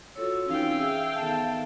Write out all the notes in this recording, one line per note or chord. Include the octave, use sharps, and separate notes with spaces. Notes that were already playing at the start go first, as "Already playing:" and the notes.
F4 F#4 A4 C#5 E6
E3 C4 C#4 D#4 F4 F5 G5
G#4 E5
D#3 B3 A4 A5